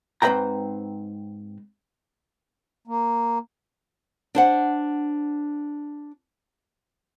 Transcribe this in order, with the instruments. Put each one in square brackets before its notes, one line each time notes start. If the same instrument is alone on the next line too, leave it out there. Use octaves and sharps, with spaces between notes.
[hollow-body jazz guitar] G#2 C4 B4 E5 G5 A#5
[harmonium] A#3
[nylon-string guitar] D4 C5 F#5